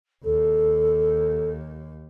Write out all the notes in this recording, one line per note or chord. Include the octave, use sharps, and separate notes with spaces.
D#2 A4